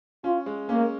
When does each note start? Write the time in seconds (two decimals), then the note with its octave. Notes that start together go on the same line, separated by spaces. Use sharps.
0.24 C#4 F4
0.46 G#3
0.69 A#3 C#4